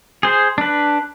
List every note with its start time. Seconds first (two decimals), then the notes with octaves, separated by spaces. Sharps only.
0.23 G#4 C5
0.58 D4 B4